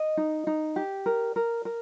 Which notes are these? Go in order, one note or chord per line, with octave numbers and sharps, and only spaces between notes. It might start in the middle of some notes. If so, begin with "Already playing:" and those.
Already playing: D#5
D#4
D#4
G4
A#4
A#4
A#4